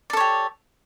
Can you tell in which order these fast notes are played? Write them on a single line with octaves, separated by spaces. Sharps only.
D5 A4 C#5 G4